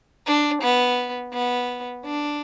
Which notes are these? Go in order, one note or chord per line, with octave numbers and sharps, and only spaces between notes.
D4
B3
B3
D4